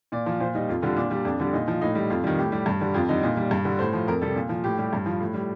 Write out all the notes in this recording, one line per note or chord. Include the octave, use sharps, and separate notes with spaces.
A#2 D5
F3
A#2 C5
G3 D#4
F2 F4
D3 G3 F4
A#2 D4
G3
F2 D4
D3 G3
A#2 D#4
F3
A2 D#4
G3
F2 F4
D#3 G3
A2 G4
G3
G2
D3 G3
F2 F4
D3 G3 D#4
A#2
G3
G2
D3 G3
A2 C5
F3
F2 A#4
C3 G3 A4
A#2
F3
A2 G4
G3
G2
F3
A2
G3